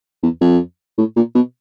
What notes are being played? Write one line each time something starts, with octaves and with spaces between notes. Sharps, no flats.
E2
F2
A2
A#2
B2